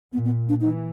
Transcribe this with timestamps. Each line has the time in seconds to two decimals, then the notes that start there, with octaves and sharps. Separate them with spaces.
0.13 A#2 B3
0.25 B3
0.49 D4
0.61 E3 D#4